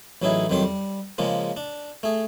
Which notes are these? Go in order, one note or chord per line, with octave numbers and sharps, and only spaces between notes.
A1 F#3 C#4 D#4 E4 G#4
C2 F2 D#3 F#3 G4 C6
G3
C#3 F3 G#3 A#3
D4
A3 G#4